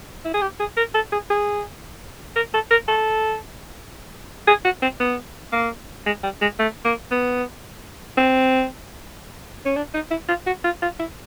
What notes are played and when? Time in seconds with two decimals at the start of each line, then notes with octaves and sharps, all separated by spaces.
0.25 E4
0.34 G#4
0.41 G4
0.60 G#4
0.77 A#4
0.94 A4
1.12 G#4
1.30 G#4
2.36 A#4
2.54 A4
2.71 A#4
2.88 A4
4.47 G#4
4.65 F#4
4.82 C4
5.00 B3
5.52 A#3
6.06 G#3
6.23 G3
6.41 G#3
6.59 A3
6.84 A#3
7.11 B3
8.17 C4
9.65 C#4
9.76 D4
9.94 D#4
10.11 E4
10.28 F4
10.46 F#4
10.64 F4
10.82 F4
10.99 E4